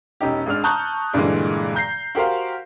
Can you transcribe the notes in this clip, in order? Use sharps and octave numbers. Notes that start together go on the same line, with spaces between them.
E1 C#4 D#4 G4
G#1 G#3 D4 F6
A5 A#5 C#6 D#6 F#6 G6
G2 A#2 D3 E3 G#3
A#5 G6 A#6 C7
F#4 G4 A#4 C5 F5